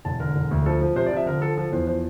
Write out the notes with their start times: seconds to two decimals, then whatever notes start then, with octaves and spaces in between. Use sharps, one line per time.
0.05 E1 A5
0.20 D3 A#4
0.35 E1
0.51 D2
0.66 F3 A4
0.81 F3
0.96 C3 C5
1.06 D5
1.12 F3 E5
1.26 D3 A#4
1.41 F3 A4
1.57 F3 A4
1.72 E2 C5
1.87 F3 C5